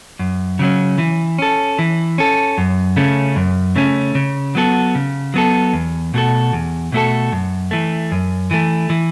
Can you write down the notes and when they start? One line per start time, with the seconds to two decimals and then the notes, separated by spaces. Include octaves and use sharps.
0.19 F#2
0.59 C#3 F#3 C#4
0.98 E3
1.39 C#4 A4
1.79 E3
2.18 C#4 A4
2.58 F#2
2.96 C#3 A3 C#4
3.36 F#2
3.76 C#3 A3 C#4
4.15 C#3
4.55 F#3 B3 F#4 A4
4.95 C#3
5.34 F#3 B3 F#4 A4
5.73 E2
6.14 B2 A3 F#4 A4
6.53 E2
6.92 B2 A3 F#4 A4
7.32 F#2
7.71 E3 A3
8.12 F#2
8.51 E3 A3
8.90 E3